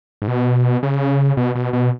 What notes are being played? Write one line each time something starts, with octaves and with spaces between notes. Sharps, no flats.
G#2
B2
C#3
B2
B2
B2